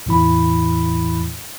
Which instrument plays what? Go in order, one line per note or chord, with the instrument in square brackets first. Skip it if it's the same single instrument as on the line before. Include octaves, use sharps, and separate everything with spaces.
[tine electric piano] E2 A2 E3 E4 B5